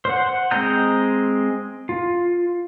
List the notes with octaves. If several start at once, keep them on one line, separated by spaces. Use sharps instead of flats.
C5 F#5
G#3 C4 D#5 A#5 G6
F4